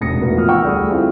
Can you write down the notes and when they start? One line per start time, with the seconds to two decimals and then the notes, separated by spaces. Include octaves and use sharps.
0.01 E1 C3 D#6 A#6 C#7
0.21 A2 A#3 B3 F#4
0.36 F3 D#6 F6
0.49 F#5 G5 C#6 E6 F6
0.63 D2 G3 G#4 D#6
0.89 A3 C4 E4 F4